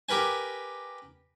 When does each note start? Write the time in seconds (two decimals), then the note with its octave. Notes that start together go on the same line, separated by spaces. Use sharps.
0.09 G4 A#4 B4 G#5